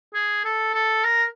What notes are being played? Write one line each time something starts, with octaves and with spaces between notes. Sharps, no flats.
G#4
A4
A4
A#4